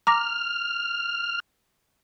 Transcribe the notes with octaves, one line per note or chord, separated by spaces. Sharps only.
A#5 D6 F6 A#6